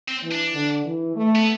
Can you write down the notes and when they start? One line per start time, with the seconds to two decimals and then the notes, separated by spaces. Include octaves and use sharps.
0.08 C4
0.23 E3
0.32 D4
0.54 D3
0.85 E3
1.16 A3
1.35 B3